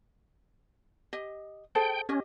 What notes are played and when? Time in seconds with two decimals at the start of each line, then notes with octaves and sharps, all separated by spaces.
1.13 G4 D#5
1.75 G#4 A4 C5 G5
2.09 C#4 G4 D#5